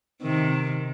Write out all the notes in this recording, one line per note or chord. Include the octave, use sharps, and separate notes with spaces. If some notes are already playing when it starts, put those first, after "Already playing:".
C3 D#3